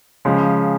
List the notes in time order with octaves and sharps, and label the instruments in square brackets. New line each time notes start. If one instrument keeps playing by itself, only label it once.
[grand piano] C#3 F3 G#3